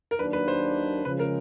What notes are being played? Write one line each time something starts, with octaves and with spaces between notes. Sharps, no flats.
A#4
D#2 D#3 F#3 A#3 D4 B4
B4
C5
C#3 F3 G#3 B4
A#4